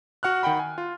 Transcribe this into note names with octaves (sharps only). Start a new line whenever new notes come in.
F#4 F#5 F6 F#6
D#3 F#5 G5 B5
G#5
F4